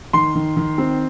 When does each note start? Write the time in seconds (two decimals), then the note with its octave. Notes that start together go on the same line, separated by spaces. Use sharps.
0.13 D#3 C6
0.35 D#3
0.57 D#3
0.78 C4